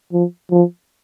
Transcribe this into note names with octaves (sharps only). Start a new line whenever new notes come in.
F3
F3